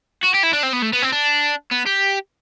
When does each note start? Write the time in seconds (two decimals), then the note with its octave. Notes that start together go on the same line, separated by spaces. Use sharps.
0.23 F#4
0.34 G4
0.43 E4
0.53 D4
0.63 C4
0.73 B3
0.82 A3
0.93 B3
1.02 C4
1.12 D4
1.72 B3
1.87 G4